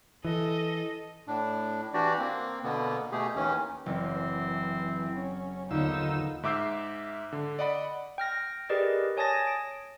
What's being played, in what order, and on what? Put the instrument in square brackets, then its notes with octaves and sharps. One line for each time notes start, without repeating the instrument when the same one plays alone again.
[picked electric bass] E3 [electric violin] A4 D#5
[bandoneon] A2 D4
E3 D4 F#4 G4 D5
A#3 C4
B2 D3 A#3 B3
B2 A3 G4 G#4
D#2 D#3 E3 C#4
[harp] F#1 [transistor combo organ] E3 [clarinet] C4
[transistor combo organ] C#4
[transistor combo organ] D#2 F4 E6 [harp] D3 B3 [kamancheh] D#4
[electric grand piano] G#2 E5 D6 E6 G6 C7
D3
D5 D#5 F#5 B5
[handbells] G5 F6 A#6
G4 G#4 A#4 B4 D5 D#5
C#5 G#5 A5 D#6 A6 A#6
D7